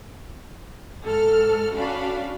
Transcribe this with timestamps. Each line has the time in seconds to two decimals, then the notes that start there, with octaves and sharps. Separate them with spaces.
1.06 G#2 A4 F6
1.74 C#4 D4 F#4 F5 B5